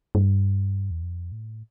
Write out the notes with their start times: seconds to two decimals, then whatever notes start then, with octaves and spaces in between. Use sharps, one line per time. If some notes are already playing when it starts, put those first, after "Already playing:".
0.15 G2
0.91 E2
1.02 F2
1.32 A2